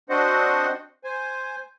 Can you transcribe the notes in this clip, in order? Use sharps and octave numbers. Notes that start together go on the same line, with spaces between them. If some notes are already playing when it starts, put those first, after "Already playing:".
C4 D4 F#4 C5 D#5 F#5
C5 G#5